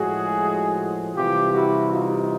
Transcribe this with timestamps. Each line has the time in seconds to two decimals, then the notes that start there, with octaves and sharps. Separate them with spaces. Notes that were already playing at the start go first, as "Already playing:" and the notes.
Already playing: A2 F3 G#3 F#4 G#4
1.15 C3 E3 G3 F4 G4
1.53 E4 F#4
1.92 D#4 F4